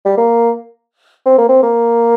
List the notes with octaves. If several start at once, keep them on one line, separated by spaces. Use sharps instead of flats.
G3
A#3
C4
A#3
C4
A#3